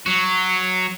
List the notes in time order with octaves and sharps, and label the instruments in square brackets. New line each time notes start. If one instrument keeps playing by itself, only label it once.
[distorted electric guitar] F#3 F#4